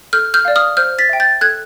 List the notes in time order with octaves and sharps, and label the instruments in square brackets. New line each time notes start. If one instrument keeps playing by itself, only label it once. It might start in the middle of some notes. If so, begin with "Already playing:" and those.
[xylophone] A4 F6 G6
F6 G6
D5 F5
D#6 F6
C5 F6 G6
A6 B6
E5 G5
G6 A6
A4 F#6 G#6